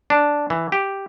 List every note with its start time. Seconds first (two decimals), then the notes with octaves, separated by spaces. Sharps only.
0.10 D4
0.50 E3
0.72 G4